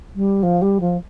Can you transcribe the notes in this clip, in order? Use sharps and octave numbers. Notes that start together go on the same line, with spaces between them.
G3
F3
G3
F3